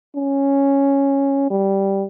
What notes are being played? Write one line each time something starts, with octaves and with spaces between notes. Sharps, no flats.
C#4
G3